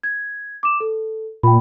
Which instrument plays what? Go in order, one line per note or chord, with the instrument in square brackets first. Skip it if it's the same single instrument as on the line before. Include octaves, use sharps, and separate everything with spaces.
[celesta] G#6
D6 E7
A4
[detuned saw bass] A#2 [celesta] G5 B5